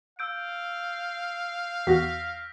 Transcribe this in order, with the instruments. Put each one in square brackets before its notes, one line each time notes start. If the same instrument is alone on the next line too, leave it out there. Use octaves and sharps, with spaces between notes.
[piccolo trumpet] F5 [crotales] E6 G6 D7
[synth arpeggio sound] E2 F#4 [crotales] F6 A#6 B6